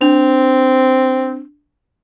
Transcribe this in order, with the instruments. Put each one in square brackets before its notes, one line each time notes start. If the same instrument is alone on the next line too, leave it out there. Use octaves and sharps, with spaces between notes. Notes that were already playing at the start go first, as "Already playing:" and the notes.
[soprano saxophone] C4 [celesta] D4 F7